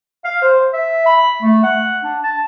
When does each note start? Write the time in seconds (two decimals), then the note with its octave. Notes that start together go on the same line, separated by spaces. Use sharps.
0.25 F5
0.42 C5
0.74 E5
1.06 B5
1.42 A3
1.64 F#5
2.04 D4
2.24 A5